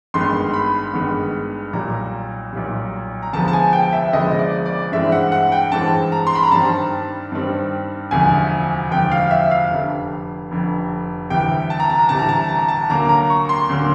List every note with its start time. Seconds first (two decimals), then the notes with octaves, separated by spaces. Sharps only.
0.14 G#1 G2 D#3 G#3 B3 C6
0.53 B5
0.93 G#1 G2 D#3 G#3 B3
1.73 B1 A#2 G3 A#5
2.53 B1 A#2 G3
3.23 A#5
3.33 D2 C3 F3 G#3 B3 A5
3.48 A5
3.53 G#5
3.73 G5
3.93 E5
4.13 D2 C3 F3 G#3 B3 D#5
4.39 D5
4.66 D5
4.92 G2 E3 G#3 C4 E5
5.12 F#5
5.32 F#5
5.52 G5
5.72 G2 E3 G#3 C4 A5
6.12 A#5
6.27 C6
6.35 B5
6.43 A#5
6.51 G2 D#3 G3 C4 A5
7.32 G2 D#3 G3 C4
8.11 E1 D2 C3 F3 G#5
8.91 E1 D2 C3 F3 G5
9.11 F5
9.31 E5
9.51 F5
9.70 F1 F2 D3
10.51 F1 F2 D3
11.30 D2 C3 E3 G3 G5
11.70 A5
11.80 A#5
11.89 A5
11.99 A#5
12.09 D2 C3 E3 G3 A5
12.19 A#5
12.29 A5
12.39 A#5
12.49 A5
12.59 A#5
12.68 A5
12.90 D2 D3 F#3 A#3 A#5
13.09 A#5
13.30 C#6
13.49 C6
13.69 D2 D3 F#3 A#3